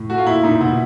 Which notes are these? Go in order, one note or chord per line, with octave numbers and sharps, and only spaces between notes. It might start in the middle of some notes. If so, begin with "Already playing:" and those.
Already playing: A2
A3 F#4
F4
A#2 E4
A#2 D#4
B2 E4